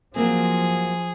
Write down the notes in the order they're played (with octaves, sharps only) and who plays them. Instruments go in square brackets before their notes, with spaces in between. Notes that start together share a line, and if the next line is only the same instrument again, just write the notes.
[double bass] F3 [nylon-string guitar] F#3 A#3 C4 [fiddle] G#4